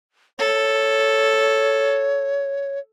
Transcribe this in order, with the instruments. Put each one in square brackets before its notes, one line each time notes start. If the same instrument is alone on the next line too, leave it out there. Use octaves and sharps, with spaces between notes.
[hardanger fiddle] A4 [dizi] C#5